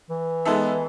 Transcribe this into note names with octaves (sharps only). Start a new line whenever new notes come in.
E3
G#3 B3 D#4 A4 E5